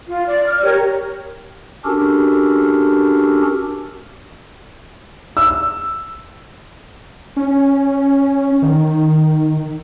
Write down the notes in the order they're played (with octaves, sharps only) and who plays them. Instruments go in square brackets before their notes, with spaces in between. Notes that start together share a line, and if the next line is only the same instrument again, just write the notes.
[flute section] F4
D5
F6
G4 A#4 C#5
[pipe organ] C#4 D4 F#4 G4 A4 A#4
[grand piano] E6
[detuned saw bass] C#4
D#3